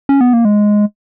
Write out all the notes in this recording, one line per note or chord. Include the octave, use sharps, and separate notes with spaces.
C#4
B3
A#3
G#3